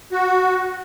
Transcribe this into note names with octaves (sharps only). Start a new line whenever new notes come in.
F#4